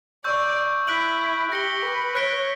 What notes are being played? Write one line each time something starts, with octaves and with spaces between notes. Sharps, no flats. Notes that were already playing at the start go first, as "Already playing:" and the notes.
D5 C#6 E6 G6
E4 F#6 B6 D7 F#7
G4 A#6 C#7 G7
B4
C#5 F#6 B6 D7 G7